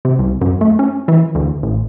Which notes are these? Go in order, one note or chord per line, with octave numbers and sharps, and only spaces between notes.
C3
C2
F#2
A3
C#4
E3
D2
A1